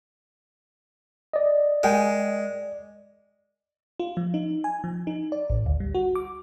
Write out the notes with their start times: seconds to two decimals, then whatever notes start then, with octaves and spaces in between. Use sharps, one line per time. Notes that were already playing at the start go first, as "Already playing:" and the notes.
1.33 D5 D#5
1.83 G#3 A#4 G5 G#5
4.00 F4
4.17 F3
4.34 D#4
4.64 G#5
4.84 F3
5.07 D#4
5.32 D5
5.50 A1
5.66 D2
5.80 G3
5.95 F#4
6.15 D6